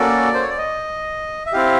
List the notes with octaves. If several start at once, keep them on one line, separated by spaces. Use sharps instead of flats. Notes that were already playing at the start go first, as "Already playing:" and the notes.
Already playing: A#3 C#4 F#4 A4 D5
C5
C#5
D5
D#5
E5
C4 E4 G4 F5